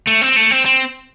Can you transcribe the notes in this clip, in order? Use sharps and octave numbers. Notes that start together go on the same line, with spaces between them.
A3
C4
A3
C4
C4